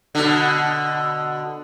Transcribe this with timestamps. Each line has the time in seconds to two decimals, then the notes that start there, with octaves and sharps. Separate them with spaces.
0.15 B2 D3